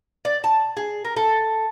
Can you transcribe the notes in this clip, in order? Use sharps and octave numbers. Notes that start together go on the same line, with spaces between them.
D5
A5
G#4
A#4
A4